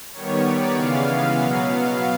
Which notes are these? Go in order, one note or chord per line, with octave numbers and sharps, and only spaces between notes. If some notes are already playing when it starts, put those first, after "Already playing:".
D#3 G3 B3 C#5
D5
C#3 E3 G#3 B3 F5
F5
B2 F#3 B3